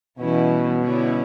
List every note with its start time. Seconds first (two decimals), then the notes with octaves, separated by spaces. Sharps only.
0.18 B2 E3 G3 C#4 E4
0.83 D3 G3 C#4 E4